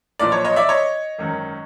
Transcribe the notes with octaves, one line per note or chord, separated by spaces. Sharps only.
B1 A#2 F3 D5
C#5
C#5 D#5
D5 E5
C#5 D#5
G#1 F#2 D#3